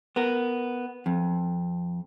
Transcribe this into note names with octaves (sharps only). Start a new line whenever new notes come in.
B3 A#4
F2